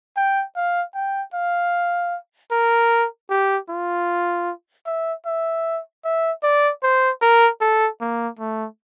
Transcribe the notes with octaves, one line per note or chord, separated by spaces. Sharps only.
G5
F5
G5
F5
A#4
G4
F4
E5
E5
E5
D5
C5
A#4
A4
A#3
A3